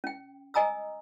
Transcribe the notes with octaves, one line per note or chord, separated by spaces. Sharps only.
C#4 G5
D#5 G#5 A#5 D#6 E6